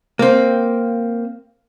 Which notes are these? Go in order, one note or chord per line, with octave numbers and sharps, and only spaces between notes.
A#3 C4